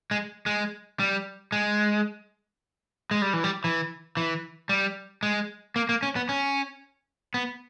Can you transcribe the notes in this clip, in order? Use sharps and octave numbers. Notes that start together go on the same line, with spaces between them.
G#3
G#3
G3
G#3
G#3
G3
E3
G3
E3
E3
G3
G#3
A#3
A#3
C#4
B3
C#4
B3